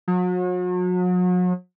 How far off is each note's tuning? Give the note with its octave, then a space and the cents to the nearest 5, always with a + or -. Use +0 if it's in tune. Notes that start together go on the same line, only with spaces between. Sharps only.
F#3 -40